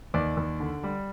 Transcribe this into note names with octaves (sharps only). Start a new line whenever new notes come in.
D#2 D5
D#2
D3
G3